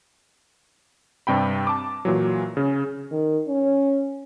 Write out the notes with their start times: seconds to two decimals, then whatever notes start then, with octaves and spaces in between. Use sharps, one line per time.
1.27 G2 C3 G5 B5
1.67 A5 D6
2.05 A#2 E3 F#3
2.57 C#3 C#4
3.11 D#3
3.48 C#4